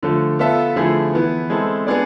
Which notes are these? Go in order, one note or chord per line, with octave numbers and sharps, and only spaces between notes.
D3 F3 A3
B3 F4 A4 E5
D3 F3 A3 E4 G#4
E3 B3 E4
G#3 C4 E4 A4
B3 D4 G#4 D5